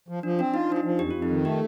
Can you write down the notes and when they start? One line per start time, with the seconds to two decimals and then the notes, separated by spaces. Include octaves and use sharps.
0.08 F3
0.23 F3 D4
0.39 C4 D4
0.54 D#4 F4
0.69 F3 D4
0.76 D#4
0.84 F3
0.99 F2 G4
1.11 F2 F4
1.22 D#4
1.30 D#3
1.45 A3 G4